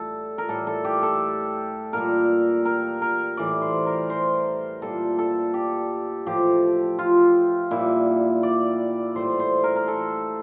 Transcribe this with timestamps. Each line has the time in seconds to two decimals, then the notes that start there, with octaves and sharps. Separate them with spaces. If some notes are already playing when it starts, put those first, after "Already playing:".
Already playing: A2 G3 A4
0.38 A#4
0.49 A2 G3 A4
0.67 A4
0.85 G4
1.03 A4
1.93 A#2 G3 A#4
2.65 A#4
3.02 A#4
3.37 A2 E3 G3 D5
3.62 C5
3.86 A#4
4.10 C5
4.82 A#2 G3 A4
5.19 A4
5.54 G4
6.27 A2 F3 G4
6.99 F4
7.71 A#2 G3 E4
8.43 D5
9.15 A2 G3 C5
9.39 C5
9.64 A#4
9.76 A#4
9.88 A4